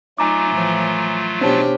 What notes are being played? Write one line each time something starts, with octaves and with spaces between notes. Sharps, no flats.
F#3 A3 D#4 F4 G#5 A#5 D6
A2 E3 F3
B2 C#4 D4 G4 C5 A5